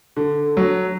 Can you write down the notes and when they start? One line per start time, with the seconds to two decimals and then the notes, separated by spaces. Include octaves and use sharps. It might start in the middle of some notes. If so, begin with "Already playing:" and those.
0.16 D3
0.57 F#3